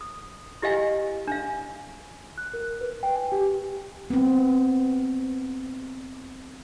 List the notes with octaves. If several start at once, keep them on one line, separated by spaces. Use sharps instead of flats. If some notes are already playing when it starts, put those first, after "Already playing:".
D#6
E4 G4 D#5 F5 G#5
D4 F5
F#6
A#4
B4
G5
G#5
G4
B3 C4